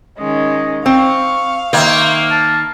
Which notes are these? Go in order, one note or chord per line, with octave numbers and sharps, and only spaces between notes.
D#3 G#3 C#4 D#5
C4 F5 C#6
D#3 A#3 C5 E5
A5